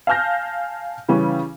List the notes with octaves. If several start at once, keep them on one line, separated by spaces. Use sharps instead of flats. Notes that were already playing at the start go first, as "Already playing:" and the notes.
F5 G#5 A5 F6 G6 A#6
C#3 E3 G3 C#4